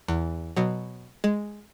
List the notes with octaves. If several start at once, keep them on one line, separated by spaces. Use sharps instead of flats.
E2
B2 F#3
G#3